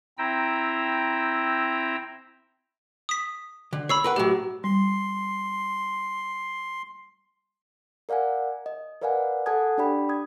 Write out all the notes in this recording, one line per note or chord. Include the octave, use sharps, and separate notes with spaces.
C4 E4 G5 A#5 E6
D#6 B6
D3
C#5 B5 E6 C7
A#4 B4 F#5
A2 F#3 G4
G3 C6
A#4 D5 F5 F#5 G#5
D#5
A#4 B4 D5 F5 F#5 G#5
A4 F#5 G#5 A5 D#6 G#6
D4 G4 D5 G5 B5
D#6 G#6